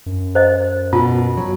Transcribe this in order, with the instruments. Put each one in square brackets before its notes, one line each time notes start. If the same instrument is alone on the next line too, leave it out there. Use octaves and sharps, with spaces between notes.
[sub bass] F#2
[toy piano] C5 D#5
[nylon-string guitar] B2 [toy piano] F4
[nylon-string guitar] F#3